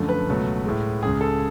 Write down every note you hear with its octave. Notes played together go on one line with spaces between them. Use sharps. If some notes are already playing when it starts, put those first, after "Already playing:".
Already playing: F#2 D3 F3 A3
B4
C#2 B2 F#3 A3
A2 G#3
C#2 C#3 G#3 G#4
A4